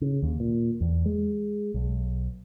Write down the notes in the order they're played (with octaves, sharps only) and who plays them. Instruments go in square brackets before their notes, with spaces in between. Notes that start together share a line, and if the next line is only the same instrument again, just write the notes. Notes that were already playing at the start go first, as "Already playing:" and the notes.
[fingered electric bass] C#3
D#2
A#2
E2
G#3
B1